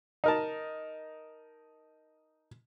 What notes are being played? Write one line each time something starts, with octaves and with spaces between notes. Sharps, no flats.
D#4 A#4 A5